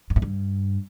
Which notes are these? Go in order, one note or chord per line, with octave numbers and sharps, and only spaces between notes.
G2
A2
G2